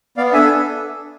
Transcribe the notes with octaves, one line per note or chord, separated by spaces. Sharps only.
B3 D5 F5
D4 A4 E5 G#5